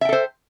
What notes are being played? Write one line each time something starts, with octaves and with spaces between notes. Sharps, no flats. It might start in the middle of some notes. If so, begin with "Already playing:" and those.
A4 C5 E5 G5